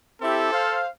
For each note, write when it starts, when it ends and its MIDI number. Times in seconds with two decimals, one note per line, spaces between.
0.22 0.52 60
0.22 0.52 64
0.22 0.52 67
0.22 0.83 69
0.52 0.87 72
0.52 0.87 77